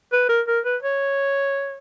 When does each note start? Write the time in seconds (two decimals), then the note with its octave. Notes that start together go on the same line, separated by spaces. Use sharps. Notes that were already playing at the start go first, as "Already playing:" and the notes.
0.13 B4
0.29 A#4
0.48 A#4
0.65 B4
0.83 C#5